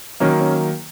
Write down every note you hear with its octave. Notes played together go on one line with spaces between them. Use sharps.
D#3 F#3 A#3 C#4
C#4